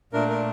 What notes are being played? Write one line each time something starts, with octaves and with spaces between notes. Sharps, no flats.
A#2 A3 D4 A#4
A#4